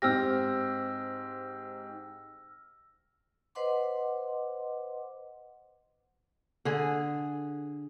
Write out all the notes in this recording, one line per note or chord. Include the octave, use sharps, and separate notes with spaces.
G#2 C4 G4 E6 F6 A#6
B4 C5 D#5 F#5 C6 D6
D3 G#4